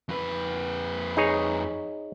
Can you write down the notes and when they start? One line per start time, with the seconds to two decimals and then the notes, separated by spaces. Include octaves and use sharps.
0.09 F2 B4
1.17 D#4 G#4 C#5